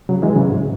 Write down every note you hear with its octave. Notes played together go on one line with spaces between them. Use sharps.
C#3 F#3
E3 G#3
C#3 F#3
G#2